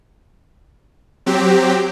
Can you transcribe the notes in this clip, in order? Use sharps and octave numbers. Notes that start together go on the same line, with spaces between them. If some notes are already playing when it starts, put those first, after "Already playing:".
F#3 C4 G4